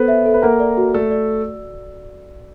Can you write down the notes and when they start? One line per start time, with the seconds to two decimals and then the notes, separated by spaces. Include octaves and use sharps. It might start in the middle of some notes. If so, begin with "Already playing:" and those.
Already playing: B3 A4 B4 C5
0.08 E5
0.26 A4
0.34 B4
0.42 A#3 A#4 F#5
0.60 D5
0.77 F#4
0.94 A3 A4 D5
1.11 D5